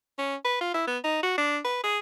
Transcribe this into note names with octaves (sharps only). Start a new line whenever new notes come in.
C#4
B4
F4
E4
B3
D#4
F#4
D4
B4
G#4